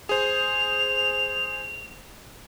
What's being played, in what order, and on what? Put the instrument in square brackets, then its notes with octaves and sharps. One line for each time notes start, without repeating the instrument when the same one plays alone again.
[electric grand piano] G#4 C5 [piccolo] F7